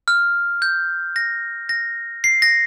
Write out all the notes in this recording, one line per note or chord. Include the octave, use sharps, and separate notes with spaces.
F6
G6
A#6
A#6
C7
A#6